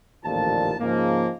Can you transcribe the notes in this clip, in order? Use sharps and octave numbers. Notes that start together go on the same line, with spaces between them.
A1 D#2 A#2 D3 F3 A5
G#2 C#3 F3 G#3 A#3